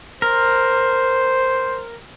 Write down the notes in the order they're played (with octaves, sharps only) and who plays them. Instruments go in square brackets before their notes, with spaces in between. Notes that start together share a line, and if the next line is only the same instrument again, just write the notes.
[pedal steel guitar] A#4 [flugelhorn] C5